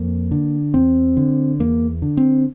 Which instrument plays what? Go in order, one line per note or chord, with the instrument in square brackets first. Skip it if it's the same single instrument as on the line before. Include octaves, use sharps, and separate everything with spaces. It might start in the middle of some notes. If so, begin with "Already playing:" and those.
Already playing: [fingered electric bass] F2 A#3
D3
E2 C4
D3
E2 A#3
D3
C4